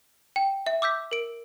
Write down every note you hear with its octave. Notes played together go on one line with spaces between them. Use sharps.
G5
E5
D6 E6 G6 B6
A#4 D7